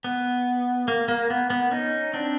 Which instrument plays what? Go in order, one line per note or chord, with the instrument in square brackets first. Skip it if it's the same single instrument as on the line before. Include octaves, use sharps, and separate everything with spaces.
[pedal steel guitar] B3
A#3
A#3
B3
B3
C#4 D#4
C4 D4